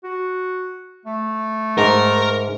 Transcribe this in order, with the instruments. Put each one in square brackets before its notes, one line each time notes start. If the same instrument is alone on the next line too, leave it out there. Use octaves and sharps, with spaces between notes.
[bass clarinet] F#4
A3
[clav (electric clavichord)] G#2 [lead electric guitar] A#4